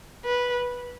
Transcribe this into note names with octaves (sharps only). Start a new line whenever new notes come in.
B4